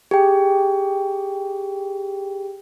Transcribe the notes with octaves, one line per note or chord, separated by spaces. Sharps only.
G4 G#4 G5